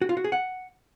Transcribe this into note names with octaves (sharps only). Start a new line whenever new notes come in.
F#4
F4
F#4
G#4
F#5